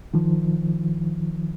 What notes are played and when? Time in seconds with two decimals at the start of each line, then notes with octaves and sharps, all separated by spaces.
0.14 D#3 F3